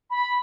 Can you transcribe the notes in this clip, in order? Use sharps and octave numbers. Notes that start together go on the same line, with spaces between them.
B5